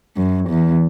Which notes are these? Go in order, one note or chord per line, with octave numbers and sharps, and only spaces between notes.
F#2
E2